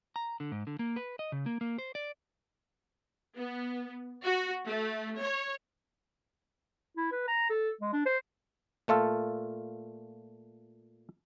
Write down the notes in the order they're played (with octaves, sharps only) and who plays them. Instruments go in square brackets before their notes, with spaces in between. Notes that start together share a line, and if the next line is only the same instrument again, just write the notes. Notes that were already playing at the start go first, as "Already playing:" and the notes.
[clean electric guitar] A#5
D3
G#2
D3
A#3
B4
D#5
C#3
A#3
A#3
C5
D5
[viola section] B3
F#4
A3
C#5
[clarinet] E4
B4
A#5
A4
G#3
D4
C5
[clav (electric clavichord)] A#2 A3 F4 A4